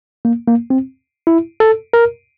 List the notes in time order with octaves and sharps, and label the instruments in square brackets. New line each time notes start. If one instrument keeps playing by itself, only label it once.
[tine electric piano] A#3
A#3
C4
E4
A4
A#4